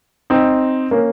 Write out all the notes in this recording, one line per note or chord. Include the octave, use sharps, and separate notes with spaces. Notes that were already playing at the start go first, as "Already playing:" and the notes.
C4 D#4
A#3 C#4